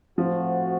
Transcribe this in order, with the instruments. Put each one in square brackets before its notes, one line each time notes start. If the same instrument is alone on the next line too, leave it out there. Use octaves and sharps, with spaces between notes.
[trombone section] A2 A3 C4 F#4 [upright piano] F3